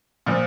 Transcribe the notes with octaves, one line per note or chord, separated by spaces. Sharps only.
A#2 F3